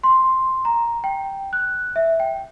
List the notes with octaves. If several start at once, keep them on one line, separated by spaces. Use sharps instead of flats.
C6
A#5
G5
F#6
E5
G5